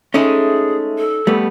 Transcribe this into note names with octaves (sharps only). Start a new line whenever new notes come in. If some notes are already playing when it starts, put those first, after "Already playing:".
G#3 A3 C#4 D#4 G#4
A4
F2 G3 A3 B3